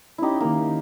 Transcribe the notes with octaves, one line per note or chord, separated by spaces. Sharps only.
C#4 D#4 E4 G4
D#3 A#3